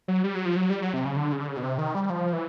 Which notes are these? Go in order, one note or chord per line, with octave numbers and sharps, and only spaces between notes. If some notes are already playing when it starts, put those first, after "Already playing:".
F#3
G3
F#3
F3
F#3
G3
F#3
C3
C#3
D3
C#3
D3
C#3
B2
C3
D#3
G3
F3
E3